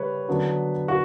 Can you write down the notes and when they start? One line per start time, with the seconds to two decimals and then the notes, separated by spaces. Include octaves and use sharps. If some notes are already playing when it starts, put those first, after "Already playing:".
Already playing: C#3 G3 B4 C#5
0.28 D3 F#3 B3 D4
0.88 F#4